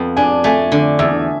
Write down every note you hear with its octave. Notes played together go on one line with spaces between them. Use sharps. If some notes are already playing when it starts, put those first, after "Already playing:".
Already playing: F2 B3
D4 G#5
A3 G#5
D3
E2 E5